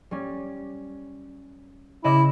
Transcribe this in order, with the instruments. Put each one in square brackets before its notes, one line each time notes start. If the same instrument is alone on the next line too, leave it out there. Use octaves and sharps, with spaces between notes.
[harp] G3 C#4
[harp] C#3 D#5 D6 [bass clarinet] E4